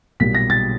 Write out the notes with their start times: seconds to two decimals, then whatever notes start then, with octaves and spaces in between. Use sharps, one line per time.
0.20 B1 A#2 G3 A#3 B6
0.35 A#6
0.50 A6